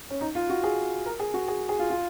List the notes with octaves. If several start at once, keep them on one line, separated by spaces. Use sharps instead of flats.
C#4
D#4
F4
F#4
G#4
A#4
G#4
F#4
G#4
G#4
F4
F4